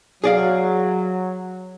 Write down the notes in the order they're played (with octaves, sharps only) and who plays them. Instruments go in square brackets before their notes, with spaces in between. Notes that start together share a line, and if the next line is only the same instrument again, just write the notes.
[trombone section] F#3 [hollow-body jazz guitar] G#4 D5 F5